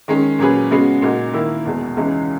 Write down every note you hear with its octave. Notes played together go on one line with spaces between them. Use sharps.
D#3 G#3 C#4
A#2 F#3 C#4 G#4 B4
C#3 G#3 B3 F#4
A#2 G#3 D#4 F#4
D#3 A#3 E4
E2 B2 G#3
C#2 C#3 E3 G#3 D#4